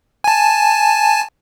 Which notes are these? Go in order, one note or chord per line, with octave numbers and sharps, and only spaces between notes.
G#5 A5